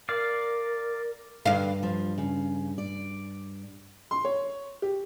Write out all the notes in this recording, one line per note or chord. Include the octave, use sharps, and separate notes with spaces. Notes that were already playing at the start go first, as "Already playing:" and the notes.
A#4 D5 F5
G2 D3 F5
F3
C#3
D5
C6
C#5
G4